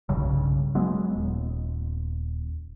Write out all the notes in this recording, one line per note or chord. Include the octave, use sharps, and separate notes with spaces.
B1 G2 C#3 G3
F#3 G#3 B3
D#1